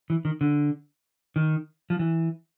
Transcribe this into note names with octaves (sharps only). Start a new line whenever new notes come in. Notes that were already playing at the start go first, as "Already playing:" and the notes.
E3
D#3
D3
D#3
F3
E3